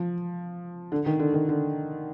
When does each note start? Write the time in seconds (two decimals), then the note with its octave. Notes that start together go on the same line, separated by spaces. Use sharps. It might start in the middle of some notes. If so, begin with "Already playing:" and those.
Already playing: F3
0.92 D3
1.06 D#3
1.19 D3
1.34 D#3
1.49 D3